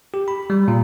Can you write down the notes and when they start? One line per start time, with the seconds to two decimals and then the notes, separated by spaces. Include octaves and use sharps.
0.14 G4
0.28 B5
0.50 G3
0.68 A#2